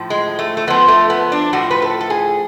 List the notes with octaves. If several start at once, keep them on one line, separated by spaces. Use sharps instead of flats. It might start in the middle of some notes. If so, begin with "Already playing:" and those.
Already playing: A2 F3
G#3
A3
A3
F2 F3 B3
A3
B3
D4
A2 F3 F#4
B4
A4
A4
G#4